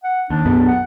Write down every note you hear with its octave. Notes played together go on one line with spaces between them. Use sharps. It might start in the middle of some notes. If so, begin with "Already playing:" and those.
F#5
D#2 D4
B1 F#2 B3
F#5